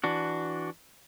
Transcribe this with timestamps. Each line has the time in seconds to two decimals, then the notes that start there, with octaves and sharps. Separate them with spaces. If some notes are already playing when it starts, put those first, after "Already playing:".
0.04 E3 D4 F#4